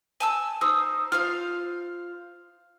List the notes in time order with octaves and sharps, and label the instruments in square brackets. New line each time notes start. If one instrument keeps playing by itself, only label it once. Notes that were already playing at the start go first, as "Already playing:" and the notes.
[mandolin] G#5 A5 E6
[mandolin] D#4 C5 [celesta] D#6 E6
[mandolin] F4 C5 F5 [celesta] F6